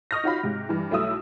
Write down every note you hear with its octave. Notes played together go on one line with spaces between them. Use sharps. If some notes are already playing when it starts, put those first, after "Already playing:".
D#5 C#6 D#6 F6 G6 A#6
D#4 F4 F#4 C#5 F5 B5
G#2 C3
G2 E3
B1 A3 E4 D#6 E6